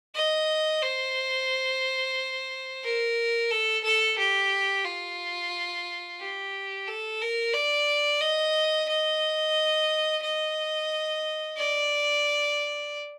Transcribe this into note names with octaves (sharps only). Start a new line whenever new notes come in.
D#5
C5
A#4
A4
A4
G4
F4
G4
A4
A#4
D5
D#5
D#5
D#5
D5